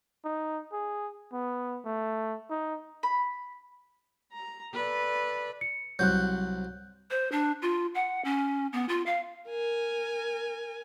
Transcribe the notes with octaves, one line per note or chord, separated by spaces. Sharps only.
D#4
G#4
B3
A3
D#4
B5
A#5
A4 B4 D5
C#7
C2 F#3 F#6 G6
C5
D4
F4
F#5
C#4
B3
F4
F5
A#4 G#5